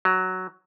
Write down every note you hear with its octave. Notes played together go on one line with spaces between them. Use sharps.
F#3